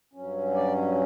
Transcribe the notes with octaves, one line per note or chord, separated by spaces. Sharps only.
G2 F#3 C#4
D5